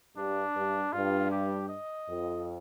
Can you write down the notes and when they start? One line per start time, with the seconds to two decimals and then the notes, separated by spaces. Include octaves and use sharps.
0.16 G2 D4
0.55 G2
0.93 G2 F4
1.31 G4
1.69 D#5
2.07 F2